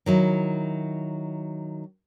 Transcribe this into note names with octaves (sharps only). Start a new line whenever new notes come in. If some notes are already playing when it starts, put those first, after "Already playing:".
D#3 F#3 E4